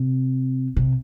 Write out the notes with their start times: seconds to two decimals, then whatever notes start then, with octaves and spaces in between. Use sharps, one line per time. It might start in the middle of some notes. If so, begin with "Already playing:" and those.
Already playing: C3
0.76 C3